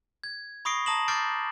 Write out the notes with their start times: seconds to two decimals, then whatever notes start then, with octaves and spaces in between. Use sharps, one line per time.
0.24 G#6
0.65 B5 C#6 D#6 A#6 C7 D7
0.86 A5 A#5 D#6 A#6 E7 F#7
1.08 D6 F6 G6 A6 C7 D7